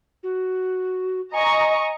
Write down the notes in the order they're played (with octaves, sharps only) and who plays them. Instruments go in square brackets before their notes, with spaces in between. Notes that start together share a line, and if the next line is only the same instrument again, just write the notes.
[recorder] F#4
[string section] D#5 A#5 C#6 [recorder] G#5